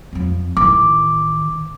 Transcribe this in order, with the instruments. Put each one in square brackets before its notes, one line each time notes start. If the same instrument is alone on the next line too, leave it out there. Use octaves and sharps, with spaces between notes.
[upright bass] F2 F3
[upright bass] A1 D#3 [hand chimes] D6